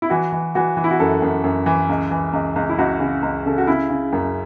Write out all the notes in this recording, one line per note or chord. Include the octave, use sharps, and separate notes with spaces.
E4
E3 F#4
E3
E3 F#4
E3
E4
F#4
F#2 A4
F#2
F#2
E3
C#2
E3
C#2
C#2
E4
C#2 F#4
C#3
C#2
C#3 A4
F#4
C#3 E4
C#3
F#2